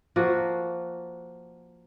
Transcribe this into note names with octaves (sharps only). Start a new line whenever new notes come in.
F3 A#3 F#4